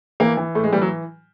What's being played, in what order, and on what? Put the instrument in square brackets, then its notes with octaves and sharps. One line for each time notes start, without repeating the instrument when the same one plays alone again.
[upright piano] E3 A#3
E3
A2 A3
G#3
E3 G3
F#3